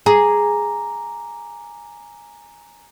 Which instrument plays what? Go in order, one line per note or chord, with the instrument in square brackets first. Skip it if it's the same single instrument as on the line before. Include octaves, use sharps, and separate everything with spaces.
[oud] G#4 [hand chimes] G#5 A#5 D6